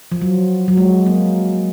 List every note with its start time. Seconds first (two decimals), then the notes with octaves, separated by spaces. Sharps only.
0.12 F3
0.22 F#3
0.68 F#3
0.77 G#3
1.06 A#3